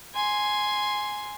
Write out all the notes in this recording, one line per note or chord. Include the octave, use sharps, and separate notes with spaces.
G#5 C6